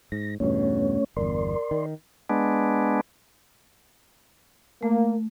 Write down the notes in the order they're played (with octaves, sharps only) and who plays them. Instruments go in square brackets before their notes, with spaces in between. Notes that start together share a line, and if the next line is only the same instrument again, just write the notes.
[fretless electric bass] G#2 [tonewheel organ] A#6
[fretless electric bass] E2 G2 B2 [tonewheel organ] A3 C#4 C#5
[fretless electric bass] G1 E2 [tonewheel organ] A#4 D5 C6
[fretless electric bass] D#3
[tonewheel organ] G#3 B3 D4
[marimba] A3 [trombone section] A#3